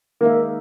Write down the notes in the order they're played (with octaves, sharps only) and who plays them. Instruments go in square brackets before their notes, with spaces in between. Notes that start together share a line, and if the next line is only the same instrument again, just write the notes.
[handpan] D#3 G#3 D#4 A#4 E5 [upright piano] A#3